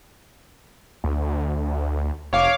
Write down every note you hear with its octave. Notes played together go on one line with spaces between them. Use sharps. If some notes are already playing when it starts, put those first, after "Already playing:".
D2
F1 C#5 F5 D6